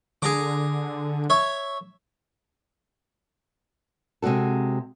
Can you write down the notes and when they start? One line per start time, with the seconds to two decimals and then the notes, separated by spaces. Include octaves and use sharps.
0.22 D3 G#4 A#5 D6
1.30 C#5 E5
4.22 C3 G#3 C4 F#4 A4